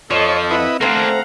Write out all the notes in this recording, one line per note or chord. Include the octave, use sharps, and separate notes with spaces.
F2 F3 A4 C#5 D#5
E4 B4 D#5 F#5
A3 A#3 C4 D4 F5 F#5 A#5